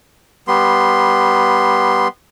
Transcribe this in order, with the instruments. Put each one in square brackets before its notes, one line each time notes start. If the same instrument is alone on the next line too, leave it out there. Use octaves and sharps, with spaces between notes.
[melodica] G3 B3 C6